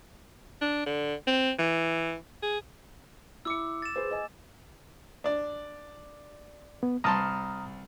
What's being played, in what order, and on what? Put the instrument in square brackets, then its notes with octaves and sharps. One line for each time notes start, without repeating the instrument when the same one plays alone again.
[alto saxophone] D4
D3
C4
E3
G#4
[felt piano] E4 C#7 [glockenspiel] D6 E6
[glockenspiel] A6 E7
[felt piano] G#4 B4 C5
D#5 G#5
[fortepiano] D4 D5
[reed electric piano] B3
[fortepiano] C2 A5 C6 [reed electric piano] A#5 D#6 F6